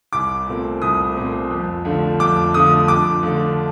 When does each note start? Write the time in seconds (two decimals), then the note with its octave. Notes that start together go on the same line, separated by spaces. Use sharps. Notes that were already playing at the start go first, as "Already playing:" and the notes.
0.13 C2 D6
0.47 A#2 A3 C4
0.82 C2 D#6
1.17 A#2 A3 C4
1.51 F2
1.85 D3 F3 A3 D4
2.19 F2 D6
2.54 D3 F3 A3 D4 D#6
2.88 F2 D6
3.23 D3 F3 A3